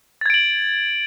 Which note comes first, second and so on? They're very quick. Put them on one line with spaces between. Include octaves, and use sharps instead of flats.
A6 G#6 D7 F#7